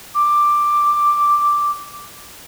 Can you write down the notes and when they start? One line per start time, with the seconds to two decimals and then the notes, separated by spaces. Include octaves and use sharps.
0.15 D6